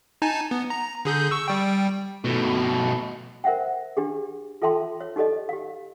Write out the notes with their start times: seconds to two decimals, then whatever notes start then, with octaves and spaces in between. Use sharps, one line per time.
0.22 D#4 G#5 A5
0.51 B3
0.70 A#5
1.05 D3 G#4 G6
1.31 C#6 E6
1.48 G3 G5
2.24 B2 A3
3.44 A#4 C5 E5 F#5 G5
3.97 D4 G4 G#4
4.62 F4 A4 E5 G5 A5 C6
5.01 C#5
5.16 D#4 G4 A4 D5 D#5
5.49 G4 F5